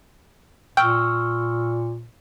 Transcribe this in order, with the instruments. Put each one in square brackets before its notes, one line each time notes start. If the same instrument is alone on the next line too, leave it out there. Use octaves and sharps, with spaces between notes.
[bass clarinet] A#2 [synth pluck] G5 [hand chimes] C#6 E6 F6